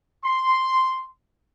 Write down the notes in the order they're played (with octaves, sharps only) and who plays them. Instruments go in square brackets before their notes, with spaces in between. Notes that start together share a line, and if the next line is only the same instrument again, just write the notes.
[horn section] C6